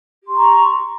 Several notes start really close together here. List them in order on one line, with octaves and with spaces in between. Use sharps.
G4 C6 C#6 A#5